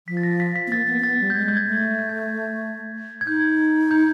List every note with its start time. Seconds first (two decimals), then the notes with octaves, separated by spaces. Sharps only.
0.08 F3 B6
0.17 A6
0.23 A#6
0.40 B6
0.56 B6
0.67 B3
0.71 A#3 A6
0.87 B3
0.99 C4
1.03 B3 A6
1.20 G3
1.30 G6
1.35 G#3 G#6
1.48 G6
1.57 G#6
1.67 A3
1.99 G6
2.09 G#6
2.19 G6
3.21 G#6
3.27 D#4 G6
3.91 G6